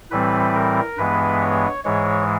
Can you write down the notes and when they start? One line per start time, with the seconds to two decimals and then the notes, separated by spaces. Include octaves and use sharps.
0.11 A2 E3 G3 C4 B4
0.54 A#4
0.97 G2 E3 G#3 B3 B4
1.41 C#5
1.84 G#2 E3 G#3 C#5